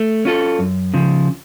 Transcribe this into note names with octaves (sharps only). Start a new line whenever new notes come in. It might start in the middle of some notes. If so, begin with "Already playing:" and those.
Already playing: A3
C#4 F4 A4
F#2
C#3 F3